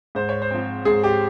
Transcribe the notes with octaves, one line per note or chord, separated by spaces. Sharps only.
G#2 C5
C#5
C5
F3 C4
G#2 G#4
G4